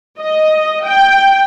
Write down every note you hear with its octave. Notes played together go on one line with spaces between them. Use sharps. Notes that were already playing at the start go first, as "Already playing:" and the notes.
D#5
G5